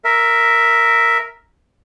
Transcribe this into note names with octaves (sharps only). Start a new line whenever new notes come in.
A#4 E5